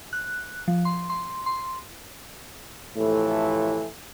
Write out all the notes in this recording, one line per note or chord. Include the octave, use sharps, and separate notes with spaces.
F#6
F3
C6
C6
C6
A2 C3 E3 F3 A3